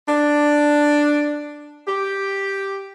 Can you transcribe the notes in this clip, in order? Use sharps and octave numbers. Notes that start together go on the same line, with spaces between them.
D4
G4